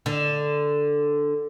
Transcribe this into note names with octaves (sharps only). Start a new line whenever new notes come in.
D3